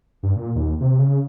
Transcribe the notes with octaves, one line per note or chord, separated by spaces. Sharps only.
G2
A#2
D#2
C3
C#3